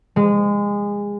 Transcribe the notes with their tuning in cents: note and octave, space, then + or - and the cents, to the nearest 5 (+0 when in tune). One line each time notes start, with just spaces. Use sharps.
G#3 -25